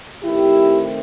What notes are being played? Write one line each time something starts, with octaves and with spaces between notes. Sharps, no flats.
D#3 A3 C4 E4 G4